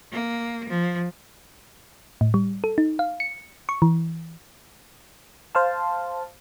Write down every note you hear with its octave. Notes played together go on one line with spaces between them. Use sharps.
A#3
F3
A2
G3
A4
D#4
F5
C#7
C#6
E3
C5 F5 A5